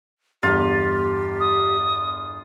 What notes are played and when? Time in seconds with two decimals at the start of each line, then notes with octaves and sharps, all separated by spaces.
0.43 G1 E2 F4 G4
1.40 D#6